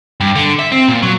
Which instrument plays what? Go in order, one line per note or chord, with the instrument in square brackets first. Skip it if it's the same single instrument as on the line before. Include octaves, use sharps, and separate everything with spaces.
[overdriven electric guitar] G2
D3
E5
C4
A#2
F#3